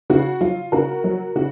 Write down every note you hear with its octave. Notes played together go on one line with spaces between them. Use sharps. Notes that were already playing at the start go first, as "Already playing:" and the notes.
C#3 F#4
F#3 F4
C#3 F#4 A#4
F#3
C#3 F#4